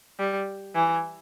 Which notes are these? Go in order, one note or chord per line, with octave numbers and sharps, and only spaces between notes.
G3
E3